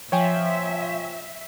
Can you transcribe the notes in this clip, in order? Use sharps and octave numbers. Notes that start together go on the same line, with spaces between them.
F3 C#5 E5 G5 G#5